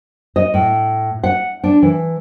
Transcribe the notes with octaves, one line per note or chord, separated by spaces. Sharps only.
D#5
A2
F#5
D4
E3